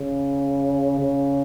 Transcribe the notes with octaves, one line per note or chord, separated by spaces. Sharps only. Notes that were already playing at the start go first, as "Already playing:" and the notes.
Already playing: C#3
C#3